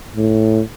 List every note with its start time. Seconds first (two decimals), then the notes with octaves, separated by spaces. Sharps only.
0.16 A2